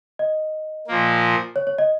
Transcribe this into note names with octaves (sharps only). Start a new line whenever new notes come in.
D#5
A#2 F3 A#3
C#5
C#5
D#5